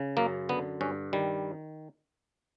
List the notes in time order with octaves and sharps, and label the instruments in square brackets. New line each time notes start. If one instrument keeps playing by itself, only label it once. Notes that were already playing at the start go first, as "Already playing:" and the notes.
Already playing: [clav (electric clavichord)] C#3
F#2 A#3
D3 B3
G2 C#4
D#3 G3